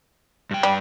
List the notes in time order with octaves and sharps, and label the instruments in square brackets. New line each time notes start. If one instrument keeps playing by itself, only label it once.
[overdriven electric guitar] G2 G5
[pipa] G3